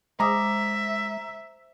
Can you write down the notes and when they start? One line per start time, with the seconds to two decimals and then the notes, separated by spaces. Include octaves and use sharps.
0.20 G#3 C5 E5 A#5 D6 D#6